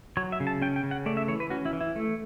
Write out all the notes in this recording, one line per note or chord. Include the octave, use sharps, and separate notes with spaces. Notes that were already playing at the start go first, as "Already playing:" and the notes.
F#3 C#5
E5
C#3
A5
C#4 G5
G5
C#3
F#5
A3 D5
E5
E3 C#5
B4
C#4 F#4
E4
E3
E4
A3